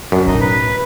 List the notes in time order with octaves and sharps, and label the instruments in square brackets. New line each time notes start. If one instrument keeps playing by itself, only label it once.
[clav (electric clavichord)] F#2 [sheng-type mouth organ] D4
[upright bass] B1 A2 [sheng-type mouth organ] D#4 D#5
[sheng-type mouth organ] B4